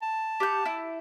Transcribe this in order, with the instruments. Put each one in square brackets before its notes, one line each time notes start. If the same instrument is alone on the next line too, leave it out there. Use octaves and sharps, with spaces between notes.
[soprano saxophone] A5
[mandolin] G4 F#5 G6
E4